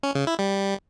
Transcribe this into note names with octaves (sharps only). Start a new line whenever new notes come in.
C#4
C#3
E4
G3